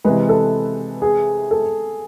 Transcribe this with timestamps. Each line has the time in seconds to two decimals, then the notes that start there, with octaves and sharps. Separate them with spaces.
0.04 C3 E3 G#3 B4
0.29 A4
1.02 G#4
1.51 A4